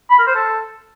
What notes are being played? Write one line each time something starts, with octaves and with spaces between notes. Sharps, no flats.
B5
A#4
C5
A4